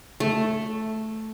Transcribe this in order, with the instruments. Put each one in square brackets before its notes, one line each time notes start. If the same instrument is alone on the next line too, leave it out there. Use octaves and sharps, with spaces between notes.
[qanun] A3